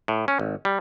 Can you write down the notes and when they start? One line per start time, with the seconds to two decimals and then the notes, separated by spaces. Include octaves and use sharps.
0.08 A2
0.28 C#4
0.39 G#1
0.65 G3